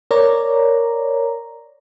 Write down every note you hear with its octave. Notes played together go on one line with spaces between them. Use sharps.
A#4 C#5 D5 A#5